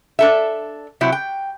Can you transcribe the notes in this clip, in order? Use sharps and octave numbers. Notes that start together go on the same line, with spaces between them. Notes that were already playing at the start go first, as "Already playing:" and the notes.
D4 A4 E5
C3 F#3 E4
G5